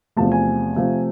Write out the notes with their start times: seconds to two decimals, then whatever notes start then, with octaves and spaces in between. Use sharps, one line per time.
0.17 E2 C3 F3 A3 A5
0.32 G#5
0.76 C3 F3 A3